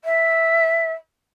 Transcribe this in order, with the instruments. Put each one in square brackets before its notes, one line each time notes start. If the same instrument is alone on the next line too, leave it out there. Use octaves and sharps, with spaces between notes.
[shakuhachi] E5